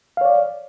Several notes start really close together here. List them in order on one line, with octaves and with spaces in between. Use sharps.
F5 C#5 D5